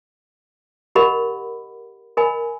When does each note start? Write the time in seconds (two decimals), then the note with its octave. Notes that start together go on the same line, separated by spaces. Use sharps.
0.95 G4 A#4 D#5 F#5 B5
2.17 A#4 D#5 G#5 B5